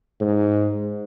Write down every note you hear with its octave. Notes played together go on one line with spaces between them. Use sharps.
G#2